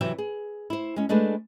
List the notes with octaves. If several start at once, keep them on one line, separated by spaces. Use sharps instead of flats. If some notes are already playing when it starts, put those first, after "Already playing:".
C3 E3 F#3 E5 G5
G#4
E4 C5
G#3 C#4
G#3 A3 D4 G#4 A4 B4